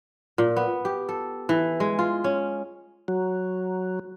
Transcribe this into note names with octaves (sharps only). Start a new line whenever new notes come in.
A#2
B3
G4
A4
E3
G#3
F4
C#4
F#3